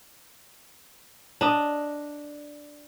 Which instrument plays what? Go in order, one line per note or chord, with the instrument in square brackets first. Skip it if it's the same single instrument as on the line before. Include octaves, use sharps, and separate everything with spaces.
[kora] D4 D#5